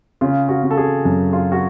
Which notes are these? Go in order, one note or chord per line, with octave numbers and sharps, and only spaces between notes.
C#3 F4
F#4
C#3
A4
G#4
F#2
F4
F#4